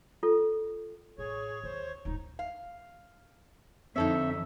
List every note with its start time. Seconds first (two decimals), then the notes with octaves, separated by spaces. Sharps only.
0.23 F4 A4
1.18 A1 G#4 C#5
1.64 D#2 C5
2.05 D#1 G#2 D#4
2.39 F5
3.96 F2 D3 C4 D#4 A4 C#5 E5